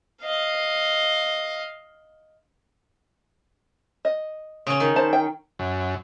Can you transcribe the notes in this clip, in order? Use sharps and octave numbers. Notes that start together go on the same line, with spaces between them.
D#5 F5
D#5
C#3 C#4
D#3
C5 A5
G5
F#2